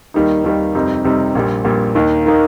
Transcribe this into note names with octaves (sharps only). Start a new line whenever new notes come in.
D#2 D#3 G3 A#3 D#4
D#2 D#3 G3 A#3 D#4
F2 C3 G3 C4 D#4
F2 C3 G3 C4 D#4
A#1 A#2 G3
A#1 A#2 G3
D#2 D#3 A#3 D#4
D#3 A#3 D#4